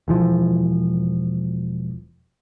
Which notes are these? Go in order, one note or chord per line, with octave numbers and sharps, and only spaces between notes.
E1 E3 F3